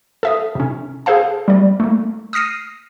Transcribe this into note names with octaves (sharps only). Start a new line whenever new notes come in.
A4 E5 D#6
C3 C#4
G#4 A4 C5 F5 A5
G3 D5
A3 A#3
D#6 F6 A#6 C7 D#7